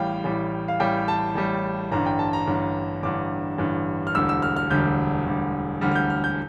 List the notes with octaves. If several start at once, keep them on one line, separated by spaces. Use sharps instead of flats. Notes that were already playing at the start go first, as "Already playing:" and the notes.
Already playing: A1 A2 G3 F5 G5
A1 A2 G3
F5
A1 A2 G3 G5
A5
A1 A2 G3
A1 G2 D3 A#5
G5
A5
A#5
A1 G2 D3
A1 G2 D3 D6
A1 G2 D3
F6
E1 D2 D3 G3 E6
E6
F6
F6
E1 D2 D3 G3 G6
E1 D2 D3 G3
E1 D2 D3 G3 F6
F6
G6
F6
G6